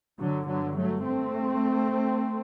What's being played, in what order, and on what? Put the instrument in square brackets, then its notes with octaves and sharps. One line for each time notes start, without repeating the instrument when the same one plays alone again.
[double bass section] G1 G2 D3 F#3
D3 F#3
F#3 A3
A3 C4